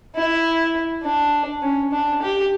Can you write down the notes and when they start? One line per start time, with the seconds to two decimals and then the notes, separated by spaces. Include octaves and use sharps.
0.16 E4
1.04 D4
1.62 C#4
1.92 D4
2.22 G4